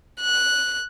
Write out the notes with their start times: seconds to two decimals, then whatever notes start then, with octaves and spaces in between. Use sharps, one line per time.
0.21 F#6